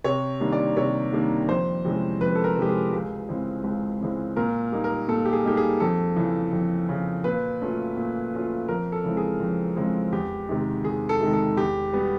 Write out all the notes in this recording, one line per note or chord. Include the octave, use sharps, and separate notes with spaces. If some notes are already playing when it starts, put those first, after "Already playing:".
C3 C#5
D#3 G3 A#3 D4
D5
C3 C#5
D#3 G3 A#3 D4
F2 C5
C3 E3 G#3 C#4
F2 B4
A4
A#4
C3 E3 G#3 C#4 G4
G#4
C#2
C#3 E3 G#3 C4
C#2
C#3 E3 G#3 C4
A#2 A#4
G3 A#3 D#4
A#4
A#2 A4
G4
G#4
G3 A#3 D#4 G4
G#4
F2 A4
C#3 E3
F2
C#3 E3
A#2 B4
F#3 A3 C#4 F4
A#2
F#3 A3 C#4 F4
F2 A#4
A4
C#3 E3 G#3 C4
G#4
F2
C#3 E3 G#3 C4
E2 G4
C3 D#3 G#3
E2 G#4
A4
C3 D#3 G#3
A4
E2 G4
B2 G3 B3